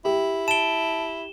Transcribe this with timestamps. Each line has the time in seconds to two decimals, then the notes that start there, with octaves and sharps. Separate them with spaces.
0.05 E4 G4
0.48 A5 D7 E7 G7